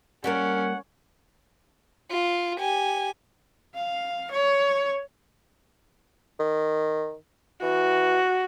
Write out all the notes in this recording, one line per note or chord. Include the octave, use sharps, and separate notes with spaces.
G3 A#3 C#4 A#4 F#5
F4
G4 G#5
F5
C#5
D#3
E3 F#4